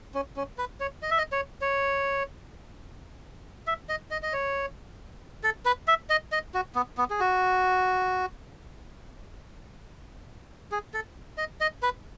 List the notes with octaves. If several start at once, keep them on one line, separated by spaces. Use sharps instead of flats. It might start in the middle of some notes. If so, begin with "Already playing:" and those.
C#4
C#4
B4
C#5
D#5
E5
D#5
C#5
C#5
E5
D#5
D#5
D#5
C#5
A4
B4
E5
D#5
D#5
F#4
B3
B3
G#4
F#4
G#4
A4
D#5
D#5
B4